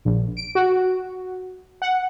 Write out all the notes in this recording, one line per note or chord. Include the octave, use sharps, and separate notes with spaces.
A#1
D7
F#4
F#5